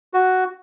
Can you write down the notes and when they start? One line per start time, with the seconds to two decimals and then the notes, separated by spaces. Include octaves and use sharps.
0.14 F#4